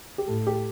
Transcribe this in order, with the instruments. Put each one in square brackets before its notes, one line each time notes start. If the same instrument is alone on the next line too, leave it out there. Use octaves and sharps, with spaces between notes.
[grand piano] G4
[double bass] A2 [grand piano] A4
[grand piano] G4